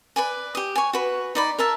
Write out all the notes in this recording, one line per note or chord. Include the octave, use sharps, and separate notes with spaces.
B4 D5 G#5
G4 D#6
C#5 G#5
F#4 B4
D#4 D5 B5
A#4 E5 A5